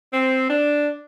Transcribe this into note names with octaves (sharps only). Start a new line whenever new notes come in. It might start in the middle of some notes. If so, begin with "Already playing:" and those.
C4
D4